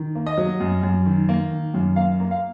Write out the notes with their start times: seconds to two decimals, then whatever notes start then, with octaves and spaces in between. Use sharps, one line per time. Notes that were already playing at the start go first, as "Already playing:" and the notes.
Already playing: D#3
0.15 A#3
0.26 D#5
0.38 F#3
0.60 F#2
0.83 F#2
1.06 D#3
1.29 A#3
1.51 D#3
1.74 F#2
1.96 A#3 F5
2.20 A#3
2.31 F5